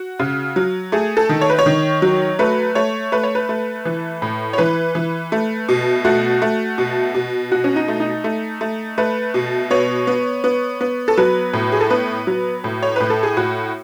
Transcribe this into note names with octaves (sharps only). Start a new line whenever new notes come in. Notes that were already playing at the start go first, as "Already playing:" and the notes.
Already playing: F#4
C#3
F#3
A3 G#4
A4
D#3
C#5
B4
C#5
D#3
F#3
A3 B4
A3 C#5
A3 B4
C#5
B4
A3
E3
A2
C#5
E3 B4
E3
A3
B2
A3 F#4
A3
B2
B2
B2 F#4
C#4
D#4
A3
D#4
A3
A3
A3 B4
B2
B3 C#5
B3
B3
B3
A4
F#3 B4
A2
G#4
A4
B3 B4
F#3
A2
C#5
A2 B4
A4
G#4
A2 F#4